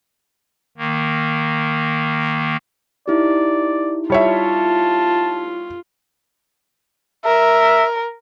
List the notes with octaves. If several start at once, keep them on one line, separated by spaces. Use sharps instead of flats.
D#3 A#3
D#4 E4 G4 D5
G3 F4 C#5 E5 A5
A#4 E5